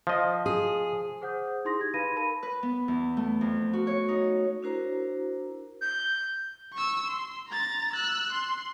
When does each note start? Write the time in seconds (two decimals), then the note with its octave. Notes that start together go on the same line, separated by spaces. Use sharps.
0.07 F3 D#5
0.46 G#4
1.21 G#4 C5 F#5 D#6 G6
1.65 D#4 E4 G#4 C6 D#6 A#6
1.77 G4 G#6
1.94 D#4 B4 F5 B5 A#6 D#7
2.16 A#4 A5 B5 D#7
2.43 B4
2.63 B3
2.88 E2
3.17 A3
3.41 F2
3.73 F#4
3.87 C#5
4.08 D#4
4.63 D4 E4 F#4 A#4 C5 A#5
5.81 G6
6.74 C#6 E6
7.07 C6
7.48 A#5 A6
7.94 E6 F#6
8.33 C6